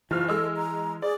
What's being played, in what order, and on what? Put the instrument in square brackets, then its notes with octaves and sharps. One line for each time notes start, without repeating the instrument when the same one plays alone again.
[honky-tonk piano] F#1 F6 [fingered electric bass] E3 [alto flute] F4
[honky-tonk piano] G#3 E6 [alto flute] A4
[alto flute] A#5
[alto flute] G#4 [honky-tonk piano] D5